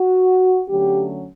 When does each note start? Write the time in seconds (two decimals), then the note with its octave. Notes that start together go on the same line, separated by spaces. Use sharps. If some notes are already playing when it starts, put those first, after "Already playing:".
Already playing: F#4
0.69 D3 F#3 A3 C#4 G4